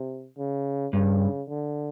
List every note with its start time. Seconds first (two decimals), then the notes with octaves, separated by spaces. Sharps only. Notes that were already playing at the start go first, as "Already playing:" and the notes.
Already playing: C3
0.38 C#3
0.93 G2 C#3
1.48 D3